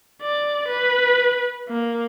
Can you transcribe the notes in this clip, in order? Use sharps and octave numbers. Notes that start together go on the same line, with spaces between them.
D5
B4
A#3